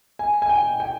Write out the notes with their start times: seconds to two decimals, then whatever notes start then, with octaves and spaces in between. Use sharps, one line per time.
0.19 G#5
0.42 G#5
0.49 G5
0.80 G5